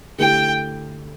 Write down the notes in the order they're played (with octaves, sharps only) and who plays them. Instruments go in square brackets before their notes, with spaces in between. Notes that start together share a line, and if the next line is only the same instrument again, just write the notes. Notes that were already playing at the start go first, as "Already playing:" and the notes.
[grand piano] D3 A3 E4 G4 [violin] G5